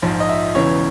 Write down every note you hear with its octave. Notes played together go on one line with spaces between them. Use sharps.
A#1 G#2 F3
D#5
E5
E1 E2 C#3 E3 C#5